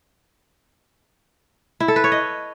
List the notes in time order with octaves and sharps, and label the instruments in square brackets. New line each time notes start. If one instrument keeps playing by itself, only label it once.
[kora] E4
A4
B4
C#5
D#5